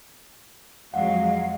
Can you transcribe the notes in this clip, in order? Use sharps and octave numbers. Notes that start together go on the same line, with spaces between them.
F2 F#3 G#3 F5 F#5